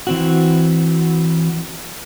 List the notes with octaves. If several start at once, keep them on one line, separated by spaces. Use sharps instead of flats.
E3 C4 F#4